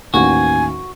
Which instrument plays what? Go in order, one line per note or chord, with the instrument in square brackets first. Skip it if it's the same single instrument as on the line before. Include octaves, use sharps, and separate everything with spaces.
[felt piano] A1 D#2 [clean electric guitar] F#4 [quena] G#5